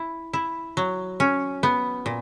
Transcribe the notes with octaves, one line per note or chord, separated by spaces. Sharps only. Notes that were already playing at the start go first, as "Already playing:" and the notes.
Already playing: E4
E4
F#3
C#4
B3
A#2